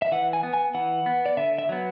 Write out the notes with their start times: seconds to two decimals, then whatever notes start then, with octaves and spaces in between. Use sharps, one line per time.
0.02 E5
0.12 E3 F#5
0.33 G#5
0.43 B3
0.54 G#5
0.74 E3 F#5
1.06 B3
1.26 D5
1.37 D3 E5
1.58 E5
1.69 F#3 B3